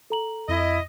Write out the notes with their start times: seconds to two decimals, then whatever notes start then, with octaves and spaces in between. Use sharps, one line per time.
0.10 A4 A#5 F#7
0.49 F2 E4 D#5